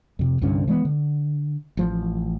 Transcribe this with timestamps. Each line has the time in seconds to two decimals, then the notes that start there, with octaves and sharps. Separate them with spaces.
0.19 F2 C3
0.41 C2 G2 D3 C#4
0.68 E3 G#3 A3 B3
0.85 D3
1.77 A1 F3